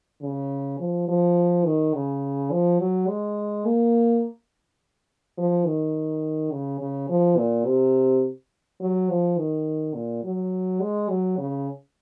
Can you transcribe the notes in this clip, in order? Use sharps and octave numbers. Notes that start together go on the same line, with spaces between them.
C#3
F3
F3
D#3
C#3
F3
F#3
G#3
A#3
F3
D#3
C#3
C#3
F3
A#2
C3
F#3
F3
D#3
A#2
F#3
G#3
F#3
C#3